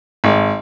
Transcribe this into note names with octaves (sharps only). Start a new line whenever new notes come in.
G#1